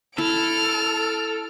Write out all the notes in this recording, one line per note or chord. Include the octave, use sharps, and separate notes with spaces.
E4 A4 F6 D7